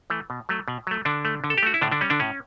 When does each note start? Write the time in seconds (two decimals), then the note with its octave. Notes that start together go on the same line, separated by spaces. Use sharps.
0.10 E3 A3
0.30 B2
0.49 F#3 A3
0.68 B2
0.87 F#3 A3
1.05 D3 D4
1.25 A3
1.44 D3
1.50 A4
1.58 G4
1.63 A3 F#4
1.74 E4
1.81 A2 D3 D4
1.92 D3 D4
2.01 G3 C#4
2.10 D3 D4
2.20 A2 C#4